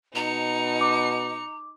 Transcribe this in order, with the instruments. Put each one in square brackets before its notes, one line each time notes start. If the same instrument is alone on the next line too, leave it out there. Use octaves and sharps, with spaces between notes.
[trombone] B2 [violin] D#4 C#7 [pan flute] A#5
[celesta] D6